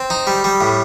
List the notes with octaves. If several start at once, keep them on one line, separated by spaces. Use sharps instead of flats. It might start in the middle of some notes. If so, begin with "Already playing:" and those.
Already playing: C4
D#4
G3
G3
A2